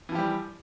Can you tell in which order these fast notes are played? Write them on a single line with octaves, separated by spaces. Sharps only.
E3 F3 G4 G3